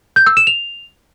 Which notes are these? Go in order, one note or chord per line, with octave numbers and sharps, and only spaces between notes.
G6
E6
E7
F7